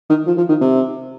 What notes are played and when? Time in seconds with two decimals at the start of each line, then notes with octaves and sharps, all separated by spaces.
0.10 D#3
0.27 F3
0.38 F3
0.49 D#3
0.61 C3